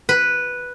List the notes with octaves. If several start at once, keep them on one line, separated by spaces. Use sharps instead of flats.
B4